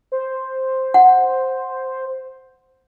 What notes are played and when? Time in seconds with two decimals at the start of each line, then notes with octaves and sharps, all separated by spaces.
0.12 C5
0.94 F#5